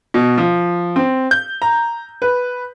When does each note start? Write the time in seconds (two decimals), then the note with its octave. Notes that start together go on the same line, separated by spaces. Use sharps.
0.14 B2
0.38 F3
0.96 C4
1.31 G6
1.62 A#5
2.22 B4